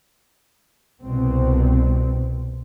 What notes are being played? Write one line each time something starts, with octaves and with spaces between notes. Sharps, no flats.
C2 B2 C4